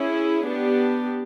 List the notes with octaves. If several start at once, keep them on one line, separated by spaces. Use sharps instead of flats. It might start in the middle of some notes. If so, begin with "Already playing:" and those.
Already playing: C#4 E4 G#4
B3 D4 G4